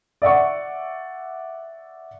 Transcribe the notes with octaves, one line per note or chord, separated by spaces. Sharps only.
D5 E5 F#5 C#6